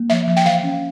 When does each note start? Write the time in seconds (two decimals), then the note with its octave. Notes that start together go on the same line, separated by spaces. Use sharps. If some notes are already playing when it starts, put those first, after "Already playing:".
Already playing: A#3
0.10 F3 E5
0.27 F3
0.37 G5
0.46 E3 F5
0.63 C#4